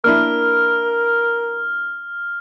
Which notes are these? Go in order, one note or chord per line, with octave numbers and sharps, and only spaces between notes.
A#3 D4 E4 A#4 F6